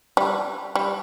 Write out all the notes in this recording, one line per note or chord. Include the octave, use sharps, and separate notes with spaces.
G3
G3